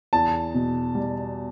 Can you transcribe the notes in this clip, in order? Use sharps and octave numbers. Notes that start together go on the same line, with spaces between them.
E2 A5
B2
G3